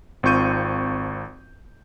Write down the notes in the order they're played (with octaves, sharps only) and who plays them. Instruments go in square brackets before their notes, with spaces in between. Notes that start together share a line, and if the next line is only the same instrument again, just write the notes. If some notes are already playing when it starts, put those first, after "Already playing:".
[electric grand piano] G#1 C4 F4 C#6 G6 D#7